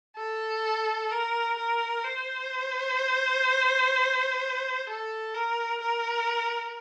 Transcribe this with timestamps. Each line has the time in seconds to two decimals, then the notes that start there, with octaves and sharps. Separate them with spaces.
0.16 A4
1.12 A#4
1.57 A#4
2.04 C5
4.87 A4
5.34 A#4
5.81 A#4